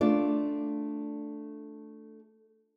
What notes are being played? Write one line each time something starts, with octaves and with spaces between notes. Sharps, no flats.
A3 D4 F4 D5